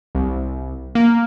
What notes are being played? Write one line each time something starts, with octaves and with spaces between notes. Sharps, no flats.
C2
A#3